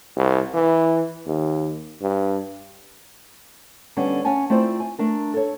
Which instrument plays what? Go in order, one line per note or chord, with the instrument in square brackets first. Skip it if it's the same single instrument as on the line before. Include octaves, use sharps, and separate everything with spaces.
[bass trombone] C2
E3
D#2
G2
[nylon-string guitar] D3 G3 B3 C#4 D4
C#4 F#5 G#5 A5
A3 C4 E4 F4 C5 D5
G#5
A3 D4 A#4
A4 C#5